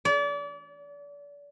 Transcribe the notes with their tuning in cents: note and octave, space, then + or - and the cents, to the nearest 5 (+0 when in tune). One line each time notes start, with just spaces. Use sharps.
D5 -35